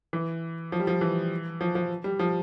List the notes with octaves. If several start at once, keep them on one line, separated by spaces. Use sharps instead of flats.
E3
F3
G3
F3
E3
F3
F3
G3
F3